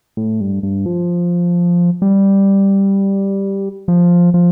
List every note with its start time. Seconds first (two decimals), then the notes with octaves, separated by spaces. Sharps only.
0.17 A2
0.41 G2
0.63 G2
0.86 F3
2.02 G3
3.88 F3
4.34 F3